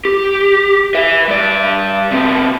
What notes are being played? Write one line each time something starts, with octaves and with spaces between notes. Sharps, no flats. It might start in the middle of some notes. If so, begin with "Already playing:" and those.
G4
B4 E5
G2 D5
C3 B3